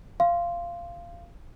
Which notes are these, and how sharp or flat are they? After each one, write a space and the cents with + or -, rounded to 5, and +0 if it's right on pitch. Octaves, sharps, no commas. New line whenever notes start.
F5 -15 C6 +0